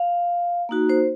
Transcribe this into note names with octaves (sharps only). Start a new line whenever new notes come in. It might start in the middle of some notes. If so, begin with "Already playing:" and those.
Already playing: F5
A#3 D#4 F#4
C5